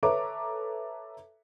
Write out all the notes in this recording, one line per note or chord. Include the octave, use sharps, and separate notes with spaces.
A4 B4 C#5 E5 A#5 D6